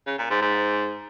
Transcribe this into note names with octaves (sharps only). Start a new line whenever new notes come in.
C#3
A#2
G#2
G#2